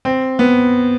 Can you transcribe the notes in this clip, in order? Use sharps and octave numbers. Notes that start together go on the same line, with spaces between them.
C4
B3